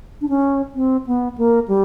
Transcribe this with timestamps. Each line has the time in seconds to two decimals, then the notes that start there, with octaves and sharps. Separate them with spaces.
0.21 D4
0.29 C#4
0.75 C4
1.07 B3
1.38 A#3
1.68 G3